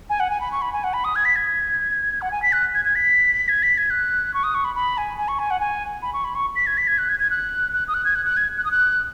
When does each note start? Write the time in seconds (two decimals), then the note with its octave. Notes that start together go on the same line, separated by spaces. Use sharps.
0.10 G#5
0.20 F#5
0.30 G#5
0.41 B5
0.52 C#6
0.62 B5
0.73 G#5
0.84 F#5
0.93 B5
1.04 D#6
1.16 G#6
1.25 B6
1.36 G#6
2.22 F#5
2.31 G#5
2.42 B6
2.53 F#6
2.75 G#6
2.85 G#6
2.95 B6
3.49 G#6
3.63 B6
3.78 G#6
3.90 F#6
4.34 C#6
4.44 D#6
4.55 C#6
4.65 B5
4.75 B5
4.98 G#5
5.18 G#5
5.28 C#6
5.39 G#5
5.51 F#5
5.60 G#5
6.02 B5
6.13 C#6
6.24 B5
6.35 C#6
6.56 B6
6.67 G#6
6.78 B6
6.88 G#6
6.98 F#6
7.09 G#6
7.20 G#6
7.30 F#6
7.73 F#6
7.88 D#6
7.94 F#6
8.05 G#6
8.15 F#6
8.26 F#6
8.37 G#6
8.57 F#6
8.65 D#6
8.71 F#6